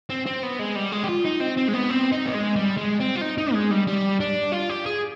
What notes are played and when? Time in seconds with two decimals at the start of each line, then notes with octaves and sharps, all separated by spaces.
0.10 C4
0.26 C4
0.43 B3
0.59 G#3
0.76 G3
0.92 G#3
1.04 G4
1.08 F4
1.25 D#4
1.41 C4
1.57 C4
1.68 G#3
1.74 B3
1.90 C4
2.12 D#4
2.26 B3
2.35 G#3
2.56 G3
2.77 G#3
3.00 C4
3.15 F4
3.21 D#4
3.38 D#4
3.54 G#3
3.71 G3
3.87 G3
4.20 D4
4.52 F4
4.70 G4
4.86 G#4